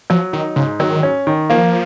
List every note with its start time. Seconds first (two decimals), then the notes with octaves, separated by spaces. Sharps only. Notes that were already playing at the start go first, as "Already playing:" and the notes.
0.10 F3 F#3
0.33 D#3 D#4
0.56 G#2 C#3
0.80 D#3 F#3
1.03 C#4
1.27 D#3
1.50 F3 A#3